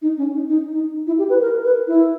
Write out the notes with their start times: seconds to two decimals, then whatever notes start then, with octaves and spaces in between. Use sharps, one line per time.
0.02 D#4
0.17 C#4
0.33 D#4
0.48 D#4
0.72 D#4
1.07 E4
1.18 G4
1.30 B4
1.41 A#4
1.64 B4
1.87 E4